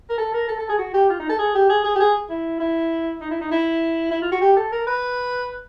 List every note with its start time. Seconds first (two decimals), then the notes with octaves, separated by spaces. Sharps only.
0.10 A#4
0.18 A4
0.34 A#4
0.48 A4
0.59 A4
0.69 G#4
0.79 F#4
0.94 G4
1.10 F4
1.20 D#4
1.29 A4
1.39 G#4
1.55 G4
1.69 G#4
1.84 G#4
1.95 G4
2.00 G#4
2.30 E4
2.60 E4
3.21 D#4
3.31 E4
3.41 D#4
3.52 E4
4.11 E4
4.22 F4
4.32 F#4
4.41 G4
4.57 A4
4.72 A#4
4.87 B4